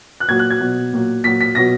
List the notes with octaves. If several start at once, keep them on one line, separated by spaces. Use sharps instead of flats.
F#6
A#2 F#3 G#6
F#6
G#6
B2 F#3
A#2 F#3
A#2 F#3 B6
B6
B2 F#3 A#6